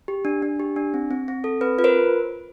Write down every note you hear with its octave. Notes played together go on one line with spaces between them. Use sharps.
G4
D4
D4
G4
D4
C4
C4
C4
A4
C4 B4
F4 B4
A#4 C5